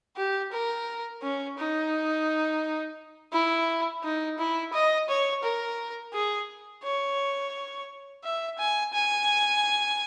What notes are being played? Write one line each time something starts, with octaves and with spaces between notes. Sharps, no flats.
G4
A#4
C#4
D#4
E4
D#4
E4
D#5
C#5
A#4
G#4
C#5
E5
G#5
G#5